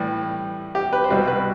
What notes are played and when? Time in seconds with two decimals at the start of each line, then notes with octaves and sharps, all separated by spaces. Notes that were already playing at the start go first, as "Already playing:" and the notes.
Already playing: A2 E3 G3 G4
0.75 G4
0.93 B4
1.04 C5
1.10 C2 B2 G3 B4
1.27 B4